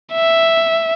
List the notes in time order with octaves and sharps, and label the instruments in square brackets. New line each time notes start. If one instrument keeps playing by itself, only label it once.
[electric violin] E5